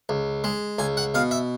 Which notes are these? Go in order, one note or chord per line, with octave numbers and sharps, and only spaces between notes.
C#2
G#3
C#2 G#5
F#5
B2 F5
E5